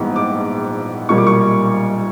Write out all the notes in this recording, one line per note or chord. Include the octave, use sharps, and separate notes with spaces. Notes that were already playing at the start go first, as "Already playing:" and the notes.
Already playing: A#1 G#2 E3 G3 B3
D6
B1 A#2 G3 A#3 C#6
D6
C#6